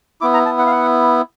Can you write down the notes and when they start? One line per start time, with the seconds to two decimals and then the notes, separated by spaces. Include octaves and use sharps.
0.21 B3 E4 D6
0.34 A#5
0.45 A5
0.58 F#5
0.67 F5
0.71 F#5